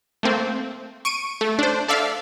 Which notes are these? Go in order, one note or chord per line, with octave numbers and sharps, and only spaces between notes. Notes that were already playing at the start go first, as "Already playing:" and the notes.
A3 A#3 C4
C#6 D7 D#7
A3
D4 C5
A4 D5 E5 F5